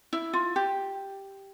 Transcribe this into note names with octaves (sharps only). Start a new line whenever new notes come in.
E4
F4
G4